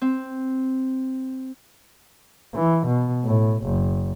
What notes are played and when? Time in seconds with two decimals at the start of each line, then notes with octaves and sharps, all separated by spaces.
0.01 C4
2.54 E3
2.86 B2
3.25 A2
3.63 F#1